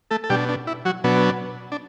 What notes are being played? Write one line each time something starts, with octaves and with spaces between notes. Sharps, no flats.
A3 A4
A4
B2 G3 D4 G4
D4
E4
F#3 F#4
B2 F#3 B3 D4
D4